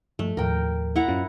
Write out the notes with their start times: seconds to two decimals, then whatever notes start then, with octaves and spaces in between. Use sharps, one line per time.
0.19 G2 F3 A3
0.37 D#2 A2 F3 A#4 G5
0.96 E4 F#5 A#5
1.08 F#2 C#4 F4